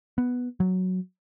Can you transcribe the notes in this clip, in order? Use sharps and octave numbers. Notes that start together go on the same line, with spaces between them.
B3
F#3